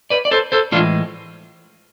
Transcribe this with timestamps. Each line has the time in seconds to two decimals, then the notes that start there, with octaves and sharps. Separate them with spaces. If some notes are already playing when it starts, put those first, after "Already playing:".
0.10 B4 D5
0.25 D5
0.31 A4 C5
0.52 A4 C5
0.72 A2 E3 G#3 D4 F4